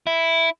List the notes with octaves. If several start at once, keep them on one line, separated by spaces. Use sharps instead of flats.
E4